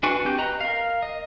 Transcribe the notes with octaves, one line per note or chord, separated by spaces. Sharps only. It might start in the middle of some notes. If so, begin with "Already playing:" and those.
D4 F#4 B4 G#5 C#6
C4 G4 G6
B4 D#5 A#5
A#4 F5
D#5